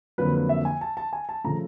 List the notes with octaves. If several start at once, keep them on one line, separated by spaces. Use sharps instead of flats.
F2 D3 F#3 A#3 B4
B4
E5
G#5
A5
A5
G#5
A5
C#3 F3 A3 A#5